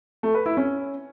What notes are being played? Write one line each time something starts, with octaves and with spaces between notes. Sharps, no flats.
A3
B4
E4
C#4